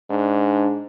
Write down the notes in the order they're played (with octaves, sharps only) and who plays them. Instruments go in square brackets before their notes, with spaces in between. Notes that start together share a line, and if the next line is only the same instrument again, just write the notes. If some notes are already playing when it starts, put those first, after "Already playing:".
[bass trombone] G#2 [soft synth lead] D4